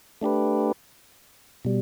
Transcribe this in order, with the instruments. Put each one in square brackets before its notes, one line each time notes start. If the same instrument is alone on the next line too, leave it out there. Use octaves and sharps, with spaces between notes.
[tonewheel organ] A3 D4 G4 B4
B2 G3